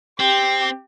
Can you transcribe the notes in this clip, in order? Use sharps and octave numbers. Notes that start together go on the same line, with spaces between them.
C4 G4